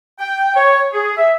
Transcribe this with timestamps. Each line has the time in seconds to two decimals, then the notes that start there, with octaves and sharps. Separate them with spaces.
0.19 G5
0.55 C#5
0.93 G#4
1.17 E5